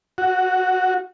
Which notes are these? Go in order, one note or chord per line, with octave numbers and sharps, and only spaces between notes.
F#4